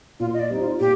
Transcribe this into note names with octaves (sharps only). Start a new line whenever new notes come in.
A#2 F4
D#5
D5
G3 C4 D#4
F4
A#2 G4